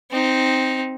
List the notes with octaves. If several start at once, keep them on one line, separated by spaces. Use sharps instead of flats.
C4 D#4